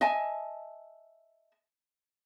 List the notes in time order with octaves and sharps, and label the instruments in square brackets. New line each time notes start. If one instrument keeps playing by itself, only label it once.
[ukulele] D#5 E5 G#5 A5